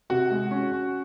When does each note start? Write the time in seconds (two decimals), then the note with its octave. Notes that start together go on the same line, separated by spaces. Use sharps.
0.10 C3 F#4
0.31 G#3
0.51 C#4
0.72 C#4